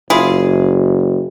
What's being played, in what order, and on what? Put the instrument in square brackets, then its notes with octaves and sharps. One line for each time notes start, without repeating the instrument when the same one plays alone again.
[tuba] F#1 [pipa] E4 F4 G#4